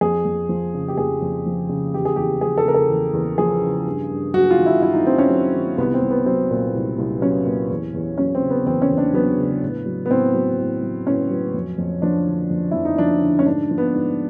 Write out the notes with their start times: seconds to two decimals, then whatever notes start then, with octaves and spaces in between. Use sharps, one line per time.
0.01 F2 G#4
0.25 F2
0.49 F3
0.74 C#3
0.88 G4
0.98 F2 G#4
1.22 F2
1.46 F3
1.69 C#3
1.94 E2 G4
2.05 G#4
2.16 E2 G4
2.41 F3 G#4
2.58 A4
2.65 C#3 A#4
2.74 A4
2.89 E2
3.13 E2
3.38 F3 G#4
3.62 C#3
3.86 G2
4.10 G2
4.34 F#3 F#4
4.50 F4
4.58 D#3
4.66 E4
4.82 G2 E4
4.93 D#4
5.06 G2 C4
5.18 C#4
5.30 F#3
5.54 D#3
5.78 C2 B3
5.94 C4
6.01 C2
6.10 B3
6.26 F#3 C4
6.51 A#2
6.75 C2
6.98 C2
7.22 F#3 C#4
7.46 A#2
7.69 E2
7.94 E2
8.18 F#3 C#4
8.35 C4
8.42 C#3
8.50 B3
8.66 E2 C4
8.82 C#4
8.91 E2
8.97 D4
9.14 F#3 B3
9.38 C#3
9.62 A2
9.86 F#3
10.06 B3
10.10 A2 C4
10.34 F#3
10.59 A2
10.83 F#3
11.07 A2 C#4
11.30 F#3
11.54 F2
11.78 F2
12.02 F3 D4
12.27 D3
12.50 F2
12.71 F2 E4
12.85 D#4
12.98 F3 D4
13.22 D3
13.39 C#4
13.46 G#2 D4
13.71 F3
13.78 B3
13.94 G#2